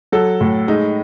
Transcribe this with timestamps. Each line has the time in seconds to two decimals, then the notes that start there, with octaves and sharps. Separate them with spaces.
0.12 F#3 A4
0.41 A2
0.68 G#3 D#4